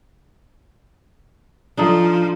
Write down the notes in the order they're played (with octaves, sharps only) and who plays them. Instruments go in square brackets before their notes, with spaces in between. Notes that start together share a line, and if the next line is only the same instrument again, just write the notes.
[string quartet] F3 [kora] D4 D#4 A4